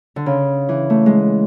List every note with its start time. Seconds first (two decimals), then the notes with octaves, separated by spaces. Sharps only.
0.16 D3
0.26 C#3
0.69 E3
0.90 A3
1.06 G#3